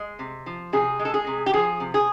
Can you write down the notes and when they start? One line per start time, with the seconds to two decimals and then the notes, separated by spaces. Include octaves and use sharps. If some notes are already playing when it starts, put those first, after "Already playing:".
Already playing: G#3
0.19 C3
0.46 F3
0.73 C3 G#4
0.99 G#3
1.05 A4
1.14 G#4
1.27 C3
1.46 G4
1.53 F3 G#4
1.80 C3
1.94 G#4